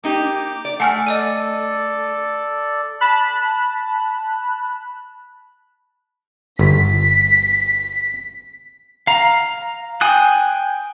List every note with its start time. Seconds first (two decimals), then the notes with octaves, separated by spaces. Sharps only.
0.04 A#3 D#4 G4 D6
0.65 D5
0.80 A3 F#5 G#5 F6
1.07 A4 D5 D#5 E6 D#7
3.01 A5 B5 F#6
6.59 G1 B6
9.07 F5 A#5
10.01 G5 G#5 D#6 F#6